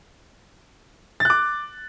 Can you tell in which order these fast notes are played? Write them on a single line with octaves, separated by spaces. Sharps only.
A6 F#6 D6